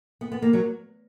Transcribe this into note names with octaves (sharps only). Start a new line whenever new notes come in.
B3
B3
A#3
F#3